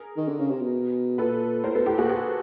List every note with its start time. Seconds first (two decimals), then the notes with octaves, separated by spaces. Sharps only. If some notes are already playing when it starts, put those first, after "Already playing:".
Already playing: G#4 A#4
0.17 D#3
0.28 D3
0.39 C#3
0.50 C3
0.61 B2
1.18 A#2 A4 B4
1.64 A2 A#4 C5
1.75 B2 A4 B4
1.86 A2 G4 A4
1.98 A#2 F#4 G#4
2.09 G4 A4